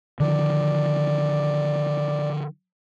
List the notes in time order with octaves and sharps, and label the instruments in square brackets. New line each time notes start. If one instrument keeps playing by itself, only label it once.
[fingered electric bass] D3 D#3 F3 [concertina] D5